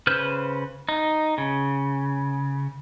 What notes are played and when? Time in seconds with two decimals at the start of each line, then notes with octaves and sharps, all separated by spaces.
0.07 C#3 B4 C5 F6 G6
0.89 D#4
1.38 C#3